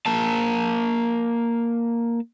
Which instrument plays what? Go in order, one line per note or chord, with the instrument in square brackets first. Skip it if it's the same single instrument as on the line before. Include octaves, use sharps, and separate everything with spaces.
[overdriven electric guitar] A#3 A5